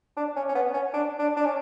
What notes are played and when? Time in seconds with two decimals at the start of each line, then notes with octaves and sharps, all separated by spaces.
0.17 D4
0.36 C#4
0.49 C#4
0.55 B3
0.74 C#4
0.94 D4
1.19 D4
1.36 D4
1.45 C#4